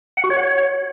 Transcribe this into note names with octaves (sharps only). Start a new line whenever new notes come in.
F#5
F#4
C#5
F#5
C#5